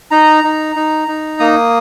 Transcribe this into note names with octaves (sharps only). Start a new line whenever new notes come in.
D#4 A#5
D#4
D#4
D#4
A#3 D#6